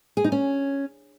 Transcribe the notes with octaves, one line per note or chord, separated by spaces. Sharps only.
G#4
D#4
C#4